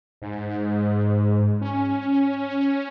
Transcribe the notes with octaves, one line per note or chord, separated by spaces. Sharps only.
G#2
C#4